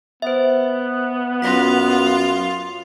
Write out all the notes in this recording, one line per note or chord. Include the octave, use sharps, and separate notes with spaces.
B3 C5 E5
F#2 F4 A#6 B6